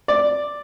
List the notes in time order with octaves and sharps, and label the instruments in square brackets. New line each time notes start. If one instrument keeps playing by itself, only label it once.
[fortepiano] D5